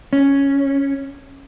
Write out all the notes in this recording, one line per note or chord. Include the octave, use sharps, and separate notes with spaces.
C#4